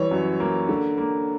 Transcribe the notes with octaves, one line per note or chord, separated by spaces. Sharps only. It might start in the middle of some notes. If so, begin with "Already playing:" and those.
Already playing: E3 G3 C#5
F#2
A#3
D3
A#3